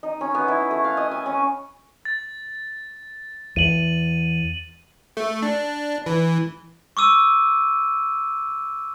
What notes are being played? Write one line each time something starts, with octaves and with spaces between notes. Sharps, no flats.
D#4
C#4
B3
E4
A3
F5
D#5
G#5
C#4
A6
E2 D#7 F#7
A3
D4
E3
C#6 D6 E6 D#7